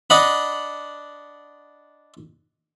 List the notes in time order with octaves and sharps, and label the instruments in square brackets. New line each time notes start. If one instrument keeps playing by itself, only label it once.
[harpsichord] D4 D#5 F#5 B5